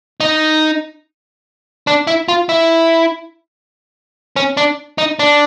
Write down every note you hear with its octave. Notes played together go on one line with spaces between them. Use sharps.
D#4
D4
E4
F4
E4
C#4
D4
D#4
D4